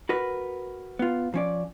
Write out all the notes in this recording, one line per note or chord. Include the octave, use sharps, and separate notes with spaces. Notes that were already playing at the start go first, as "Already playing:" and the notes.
F#4 A#4 B4
B3 F4
F3 C#4 D5